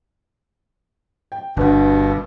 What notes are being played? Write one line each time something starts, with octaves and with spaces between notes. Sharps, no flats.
G5
G1 G2 B2 D4 B4 F#5
E6